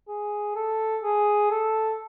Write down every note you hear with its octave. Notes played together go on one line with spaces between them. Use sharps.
G#4
A4
G#4
A4